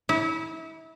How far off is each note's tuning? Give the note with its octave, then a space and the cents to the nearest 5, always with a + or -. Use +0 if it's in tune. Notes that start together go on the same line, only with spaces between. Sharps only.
E4 -30